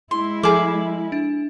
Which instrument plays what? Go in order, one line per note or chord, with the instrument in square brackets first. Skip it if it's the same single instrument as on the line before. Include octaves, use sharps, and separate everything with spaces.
[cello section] G#3 E4 [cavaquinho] C6
[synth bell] F3 A4 F#7 [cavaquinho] G#4 D6
[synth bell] D4